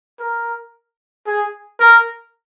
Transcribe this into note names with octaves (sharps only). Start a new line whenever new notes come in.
A#4
G#4
A#4